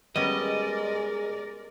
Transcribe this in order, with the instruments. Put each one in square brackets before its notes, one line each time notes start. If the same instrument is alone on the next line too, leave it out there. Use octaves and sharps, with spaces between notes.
[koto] G3 B3 C#4 [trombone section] G#3 [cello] A#4 D5 [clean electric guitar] D#5